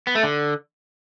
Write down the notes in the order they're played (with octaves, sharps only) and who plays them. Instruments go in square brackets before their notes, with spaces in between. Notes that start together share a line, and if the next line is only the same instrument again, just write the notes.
[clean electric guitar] B3
A3
D3